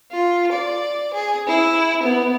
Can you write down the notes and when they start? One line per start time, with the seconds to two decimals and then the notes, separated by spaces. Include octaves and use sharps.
0.10 F4
0.51 D5
1.12 G#4
1.47 E4
2.02 B3